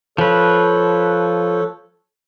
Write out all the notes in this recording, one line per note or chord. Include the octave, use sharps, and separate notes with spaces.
F3 A4 B4 C#5